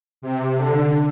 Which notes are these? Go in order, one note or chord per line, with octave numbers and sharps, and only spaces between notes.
C3
D3